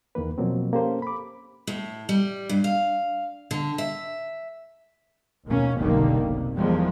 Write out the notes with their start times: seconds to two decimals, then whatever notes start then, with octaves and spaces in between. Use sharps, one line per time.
0.15 E2 D#3 A#3 B4
0.38 B2 F3 F#3 A#3 C4
0.73 A#3 C#4 G4 A4 C5
1.02 B5 D6
1.67 A2
2.09 G3
2.49 G2
2.64 F5
3.51 D3
3.78 E5
5.47 D#2 B2 A#3 C#4
5.77 F1 B1 D3 D#3 G3 A#3
6.21 B1 C3
6.56 E2 D#3 F3 G3 G#3